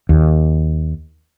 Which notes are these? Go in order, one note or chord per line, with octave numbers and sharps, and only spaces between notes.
D#2